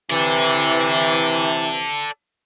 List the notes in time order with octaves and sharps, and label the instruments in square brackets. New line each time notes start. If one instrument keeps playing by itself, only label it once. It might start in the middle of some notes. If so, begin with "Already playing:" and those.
[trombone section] C3 E3 [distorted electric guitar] A4 D5